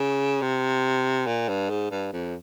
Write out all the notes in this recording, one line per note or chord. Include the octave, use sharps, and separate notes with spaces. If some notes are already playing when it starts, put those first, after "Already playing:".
Already playing: C#3
C3
A#2
G2
G#2
G2
F2